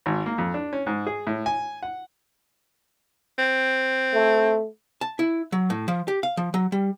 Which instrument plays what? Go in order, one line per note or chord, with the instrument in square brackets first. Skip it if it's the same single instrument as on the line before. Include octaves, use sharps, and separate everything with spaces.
[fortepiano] G#1
A#3
F2
D4
C#4
G#2
G#4
A2
G#5
F#5
[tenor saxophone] C4
[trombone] A3
[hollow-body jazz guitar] A5
E4
F#3
A2
F3
G4
F5
F3
F#3
G3